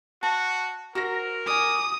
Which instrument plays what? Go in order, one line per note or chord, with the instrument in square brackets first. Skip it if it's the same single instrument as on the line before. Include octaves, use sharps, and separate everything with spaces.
[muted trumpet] F#4 [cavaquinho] A5
[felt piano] F#4 A#6 [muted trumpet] A#4 [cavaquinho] C5
[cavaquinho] D5 G#5 [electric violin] D#6